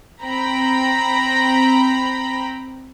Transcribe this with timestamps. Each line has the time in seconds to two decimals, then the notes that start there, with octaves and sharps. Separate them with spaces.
0.23 C4 G5 A#5 B5